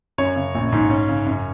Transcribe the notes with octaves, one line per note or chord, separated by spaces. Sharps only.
F#2 C#5
C#3
A#1
G#2
C#4
C#3
F#2